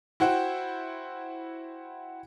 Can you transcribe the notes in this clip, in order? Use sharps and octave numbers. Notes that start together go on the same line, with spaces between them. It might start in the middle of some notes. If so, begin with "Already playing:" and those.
E4 F#4 C5 F#5 G5